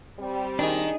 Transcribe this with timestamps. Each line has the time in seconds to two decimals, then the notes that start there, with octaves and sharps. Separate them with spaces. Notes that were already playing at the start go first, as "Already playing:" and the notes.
0.19 G3 C4
0.59 D#3 D4 G#4